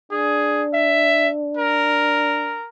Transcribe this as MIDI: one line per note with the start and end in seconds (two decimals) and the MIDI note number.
0.11 2.58 62
0.11 0.63 68
0.74 1.29 76
1.57 2.67 70